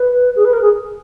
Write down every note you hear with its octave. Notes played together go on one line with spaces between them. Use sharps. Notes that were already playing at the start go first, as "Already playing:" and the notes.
Already playing: B4
G#4
B4
A#4
G#4